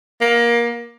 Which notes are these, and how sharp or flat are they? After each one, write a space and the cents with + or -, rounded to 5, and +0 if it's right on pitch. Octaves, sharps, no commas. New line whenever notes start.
A#3 +20